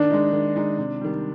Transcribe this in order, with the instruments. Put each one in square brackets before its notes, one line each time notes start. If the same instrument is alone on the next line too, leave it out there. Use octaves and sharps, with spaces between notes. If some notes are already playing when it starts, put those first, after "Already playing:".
Already playing: [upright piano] D#3 [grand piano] D4
[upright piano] G#3 D#4
D#3
G#3 D#4
C3
D#3 G3